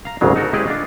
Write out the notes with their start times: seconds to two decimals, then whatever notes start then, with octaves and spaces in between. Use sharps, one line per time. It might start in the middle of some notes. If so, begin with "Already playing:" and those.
0.05 F5 A#5
0.21 G#1 D2 G#2 C#3 F#3 F5
0.36 D#4 F#4 A4 A#4
0.53 G#3 E4 G4 G#4 D5 D#5
0.67 D4 F4